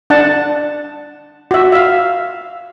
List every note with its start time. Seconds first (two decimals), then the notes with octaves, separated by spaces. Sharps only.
0.10 D4 F#5 A5
1.51 F#4 E5
1.72 E5 F5